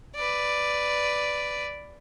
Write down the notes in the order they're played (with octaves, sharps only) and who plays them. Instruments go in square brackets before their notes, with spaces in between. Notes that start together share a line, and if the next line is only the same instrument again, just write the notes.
[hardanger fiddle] B4 D5